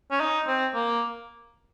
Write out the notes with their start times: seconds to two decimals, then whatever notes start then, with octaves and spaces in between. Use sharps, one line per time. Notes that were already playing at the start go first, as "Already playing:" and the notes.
0.11 C#4
0.20 D#4
0.47 C4
0.74 A#3